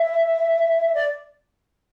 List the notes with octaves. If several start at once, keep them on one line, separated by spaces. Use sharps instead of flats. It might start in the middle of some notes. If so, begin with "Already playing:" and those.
Already playing: E5
D5